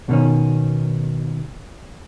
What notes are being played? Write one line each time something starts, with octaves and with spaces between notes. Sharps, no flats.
B2 D#3 C#4